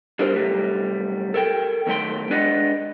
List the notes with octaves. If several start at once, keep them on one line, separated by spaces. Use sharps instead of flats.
G3 D4 A#4 C5
C3 F#3 G3 A3
A4 A#4 G5
D#2 F#3 A3 C#5 G5 C6
G#3 D4 B4 D5 D#5 F#5